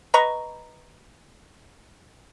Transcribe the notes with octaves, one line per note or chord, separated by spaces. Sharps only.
B4 D#5 A#5 C#6